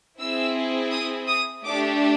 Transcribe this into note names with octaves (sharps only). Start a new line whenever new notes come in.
C4 E4 G#4 E6
D#6
D#6
A3 D4 G4 D6